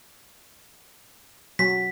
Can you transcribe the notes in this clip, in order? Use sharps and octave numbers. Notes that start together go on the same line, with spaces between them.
F#3 B6